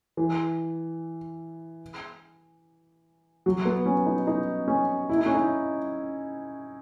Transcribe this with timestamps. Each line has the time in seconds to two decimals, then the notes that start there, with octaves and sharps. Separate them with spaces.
0.17 E3
3.46 F#3
3.65 B3
3.86 C#4
4.06 D#4
4.27 D#4
4.68 C#4
5.09 E4
5.17 D#4
5.26 C#4
5.35 D#4